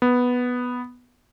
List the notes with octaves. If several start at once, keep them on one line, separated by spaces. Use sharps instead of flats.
B3